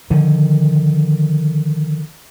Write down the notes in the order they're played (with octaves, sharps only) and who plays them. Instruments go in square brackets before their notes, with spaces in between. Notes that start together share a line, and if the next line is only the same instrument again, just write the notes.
[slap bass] D3 D#3 F3